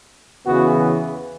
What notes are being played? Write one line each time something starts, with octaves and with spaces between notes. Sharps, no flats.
E2 C#3 E3 B3 F#4